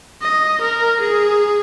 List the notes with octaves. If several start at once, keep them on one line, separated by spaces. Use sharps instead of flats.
D#5
A#4
G#4